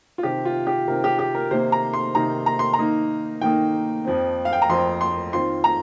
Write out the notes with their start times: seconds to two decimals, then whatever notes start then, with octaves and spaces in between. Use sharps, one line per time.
0.18 F4
0.23 C3 D#3 C4 G4
0.45 F4
0.67 G4
0.88 C3 D#3 C4 A#4
1.04 G4
1.19 G4
1.35 A#4
1.51 C3 D#3 A#3 D#4 C5
1.72 A#5
1.94 C6
2.15 C3 D#3 A#3 D#4 A#5
2.46 A#5
2.59 C6
2.73 A#5
2.79 D#3 A#3 D#4
3.41 D#3 A#3 D#4 G5
4.05 F2 F3 C4
4.45 F5
4.53 G5
4.62 A#5
4.69 F2 F3 C4 C6
5.01 C6
5.33 D#3 C4 F4 C6
5.64 A#5